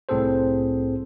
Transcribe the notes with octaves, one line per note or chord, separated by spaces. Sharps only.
C2 A2 C4 G#4 A4 C5